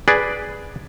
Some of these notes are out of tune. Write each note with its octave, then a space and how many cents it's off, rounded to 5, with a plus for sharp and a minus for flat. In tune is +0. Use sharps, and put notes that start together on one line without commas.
G#4 +0 B4 +0 D5 +0